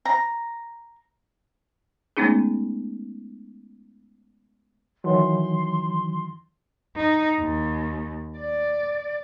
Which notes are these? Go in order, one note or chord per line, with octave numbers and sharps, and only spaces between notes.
A#5
G#3 A3 B3 C#4 D#4 G#4
D#3 E3 F#3 C6
D#4
D#2
D5